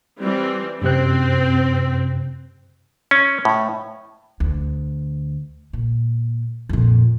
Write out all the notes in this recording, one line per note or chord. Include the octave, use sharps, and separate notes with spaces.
E3 G3 C4
F#2 C3 C4 F#6
C#4
A2
D2
A#2
F2 A#2